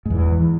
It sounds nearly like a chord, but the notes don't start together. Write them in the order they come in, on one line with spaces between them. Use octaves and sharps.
G#2 E2 E3